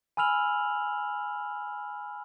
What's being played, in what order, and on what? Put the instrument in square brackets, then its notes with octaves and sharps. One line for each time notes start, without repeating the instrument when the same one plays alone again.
[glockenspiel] G#5 B5 E6 F6 F7 F#7